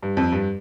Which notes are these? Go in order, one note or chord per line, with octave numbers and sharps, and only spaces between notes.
G2
F2
G2